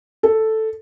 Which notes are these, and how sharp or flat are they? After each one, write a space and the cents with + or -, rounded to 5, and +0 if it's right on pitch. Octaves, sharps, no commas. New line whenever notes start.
A4 +0